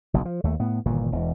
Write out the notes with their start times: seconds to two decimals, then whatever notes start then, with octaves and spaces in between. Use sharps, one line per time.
0.14 F#1 B1 F#2
0.25 F3
0.44 D#2 A3
0.60 A2 B3
0.86 G1 A#2 D#3 E3
1.12 E1 E2